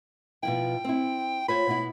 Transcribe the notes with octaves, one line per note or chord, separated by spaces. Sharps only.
B2 F3 E4 G5
C4 E4
F4 C5 C#5 B5
B2 B3 E4